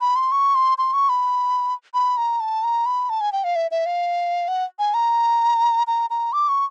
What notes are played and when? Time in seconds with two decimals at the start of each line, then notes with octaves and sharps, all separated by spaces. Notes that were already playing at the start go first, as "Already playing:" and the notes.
0.01 B5
0.16 C6
0.32 C#6
0.55 C6
0.78 C6
0.94 C#6
1.09 B5
1.94 B5
2.17 A#5
2.40 A5
2.63 A#5
2.86 B5
3.10 A5
3.21 G#5
3.32 G5
3.44 F5
3.56 E5
3.71 E5
3.86 F5
4.48 F#5
4.79 G#5
4.94 A#5
5.87 A#5
6.10 A#5
6.33 D6
6.49 C#6